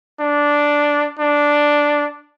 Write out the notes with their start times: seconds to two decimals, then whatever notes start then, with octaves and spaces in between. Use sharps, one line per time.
0.21 D4
1.19 D4